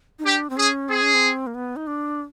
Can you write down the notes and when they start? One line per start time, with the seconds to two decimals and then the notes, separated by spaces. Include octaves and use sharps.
0.19 D#4
0.24 D4 G4
0.50 C4
0.57 C#4 G#4
0.89 C4 G#4
1.02 C#4
1.14 C4
1.47 A#3
1.55 B3
1.76 D#4
1.87 D4